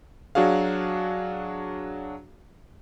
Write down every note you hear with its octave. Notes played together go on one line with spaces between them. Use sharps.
F#3 D4 F#4 G#4 F5